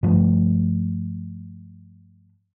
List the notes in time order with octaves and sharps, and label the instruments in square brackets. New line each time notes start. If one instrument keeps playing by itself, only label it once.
[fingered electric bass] G2 F3 A3